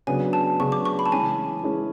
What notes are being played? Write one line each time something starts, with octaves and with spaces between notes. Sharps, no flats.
C#3 F#3 B3 D4 G#4 G#5
A5
C#3 F#3 B3 D4 G#4 C#6
D6
C#6
B5
A5
E3 G#3 C#4 G#4 G#5
E3 G#3 C#4 G#4